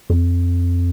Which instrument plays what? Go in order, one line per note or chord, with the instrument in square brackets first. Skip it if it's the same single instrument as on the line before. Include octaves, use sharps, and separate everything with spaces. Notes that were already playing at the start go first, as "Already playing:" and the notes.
[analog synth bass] F2